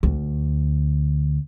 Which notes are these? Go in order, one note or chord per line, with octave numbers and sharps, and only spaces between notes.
D2